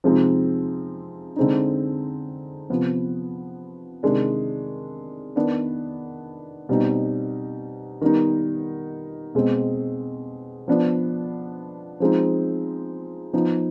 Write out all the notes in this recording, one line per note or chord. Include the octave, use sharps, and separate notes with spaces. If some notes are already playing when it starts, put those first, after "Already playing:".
C3 F3 G#3 C4 D#4
D3 G#3 C4 D#4
C3 F3 B3
C3 D#3 G#3 D4
D#3 B3 D4
B2 G3 C4 D#4
D#3 G3 B3 D#4
B2 G#3 C4
F3 B3 D4
F3 G#3 C4 D#4
F3 B3 D#4